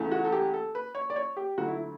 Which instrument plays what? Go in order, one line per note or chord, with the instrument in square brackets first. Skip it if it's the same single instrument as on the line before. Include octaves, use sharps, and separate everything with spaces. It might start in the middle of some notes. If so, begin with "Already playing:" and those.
Already playing: [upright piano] E2 C#3 E3 A3
F#4
A4
G4
A4
B4
C#5
D5
C#5
G4
D2 D3 F#3 A3 F#4
E4